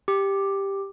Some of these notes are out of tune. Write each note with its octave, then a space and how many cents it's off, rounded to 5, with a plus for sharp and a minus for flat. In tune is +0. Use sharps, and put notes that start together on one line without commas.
G4 +5